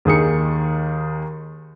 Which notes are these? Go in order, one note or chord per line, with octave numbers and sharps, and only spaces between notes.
D#2 D#3 G#4 C#7